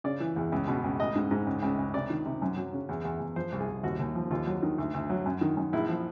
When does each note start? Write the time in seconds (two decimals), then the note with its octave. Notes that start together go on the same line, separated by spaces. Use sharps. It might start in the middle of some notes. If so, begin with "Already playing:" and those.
0.04 C#3 D5
0.20 E3
0.36 E2
0.52 C#2
0.68 B2
0.84 C#2
0.99 A1 D#5
1.15 G#2
1.31 G#2
1.47 C#2
1.63 C#2
1.79 C#2
1.94 C3 D5
2.10 D#3
2.25 C3
2.42 F#2
2.57 F#3
2.73 C#3
2.89 E2
3.05 E2
3.20 E2
3.36 F3 C5
3.52 C2
3.60 G#4
3.68 C2
3.84 D#2 F#4
3.99 D#2
4.15 F3
4.31 D#2 F4
4.47 F#3
4.63 D#3
4.78 D2
4.94 D2
5.10 F#3
5.26 F#2
5.41 D#3
5.57 F#2
5.73 A#1 E4
5.89 F3